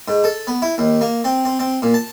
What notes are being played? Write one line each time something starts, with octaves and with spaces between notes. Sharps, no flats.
G#2
A4
B3
E4
D#2
A#3
C4
C4
C4
A#2
A5